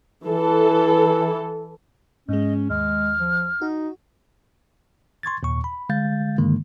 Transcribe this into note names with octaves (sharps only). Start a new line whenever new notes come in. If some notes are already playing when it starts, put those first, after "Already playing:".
E3 A4
G#2 G#3 C#4 D#5
D#2 G#3 F6
F3
D#4 F#4
C6 C#6 G#6 A6
D#2 A#2 C#6
B5
D3 G#3 F5 G6 A6
G2 D3 D#3 G#3 A#3